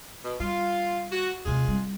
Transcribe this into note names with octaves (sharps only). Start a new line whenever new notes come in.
B2
G3 F4
F#4
D#2 C3 G#3 F4 G#4
G3 C4